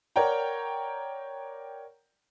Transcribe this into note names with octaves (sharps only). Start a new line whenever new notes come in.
A#4 C#5 D5 F#5 G5 A#5